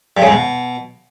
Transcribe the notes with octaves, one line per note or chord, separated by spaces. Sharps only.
G2
C#3
G#2
B2